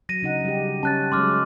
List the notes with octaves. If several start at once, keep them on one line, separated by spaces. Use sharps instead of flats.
F#3 A#6 D#7
C#3 D#4 F#5
G3 G4
C#4 A5 F#6 A6
F#3 G#3 C#4 C6 D6 F6